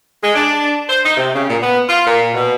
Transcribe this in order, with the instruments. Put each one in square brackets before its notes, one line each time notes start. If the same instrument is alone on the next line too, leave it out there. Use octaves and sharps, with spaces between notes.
[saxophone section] G#3
D4
C5
D#4
C3
C#3
A#2
B3
F4
A#2
B2